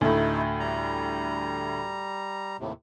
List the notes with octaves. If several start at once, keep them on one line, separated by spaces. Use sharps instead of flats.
D2 A2 A3 D#4 E4
G3 A#5
D#2 A2 C3